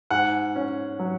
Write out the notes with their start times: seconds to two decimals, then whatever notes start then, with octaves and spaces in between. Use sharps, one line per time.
0.10 G#2 F#5
0.56 C#4
0.99 F#3